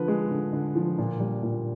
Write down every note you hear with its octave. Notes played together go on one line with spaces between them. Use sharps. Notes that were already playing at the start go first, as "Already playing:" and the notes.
Already playing: D3 F3 B4
G#3
D3
D3
F3
A#2
G3
A#2